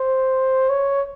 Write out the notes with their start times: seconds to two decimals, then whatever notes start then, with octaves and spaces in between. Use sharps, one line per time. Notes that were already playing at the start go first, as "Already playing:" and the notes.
Already playing: C5
0.69 C#5